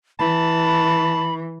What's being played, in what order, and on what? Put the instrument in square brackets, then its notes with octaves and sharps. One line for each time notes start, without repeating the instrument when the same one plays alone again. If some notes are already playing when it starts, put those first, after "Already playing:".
[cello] E3 [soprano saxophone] A5 [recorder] B5